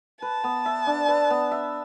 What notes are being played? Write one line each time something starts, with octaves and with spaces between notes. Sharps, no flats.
B4 A5
B3
E5
D4
B4
B3
E5